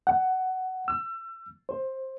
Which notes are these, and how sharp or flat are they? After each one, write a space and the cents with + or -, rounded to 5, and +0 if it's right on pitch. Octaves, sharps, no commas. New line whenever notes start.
F#5 +15
E6 +30
C5 +15